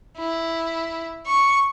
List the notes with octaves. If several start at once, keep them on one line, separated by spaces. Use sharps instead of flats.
E4
C#6